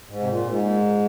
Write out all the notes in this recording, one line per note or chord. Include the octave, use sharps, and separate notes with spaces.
G#2
C3
A#2
G#2